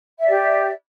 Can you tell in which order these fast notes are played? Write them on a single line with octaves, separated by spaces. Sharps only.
E5 D5 G4